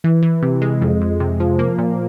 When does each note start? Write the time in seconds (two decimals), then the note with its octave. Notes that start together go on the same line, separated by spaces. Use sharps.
0.04 E3
0.23 E3
0.43 C3
0.62 G#3
0.82 F2
1.01 F2
1.20 C3
1.40 F3
1.59 A#3
1.78 A#2